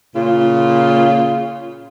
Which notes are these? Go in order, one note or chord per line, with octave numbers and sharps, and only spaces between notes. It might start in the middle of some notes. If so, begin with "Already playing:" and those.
A#2 C#3 F4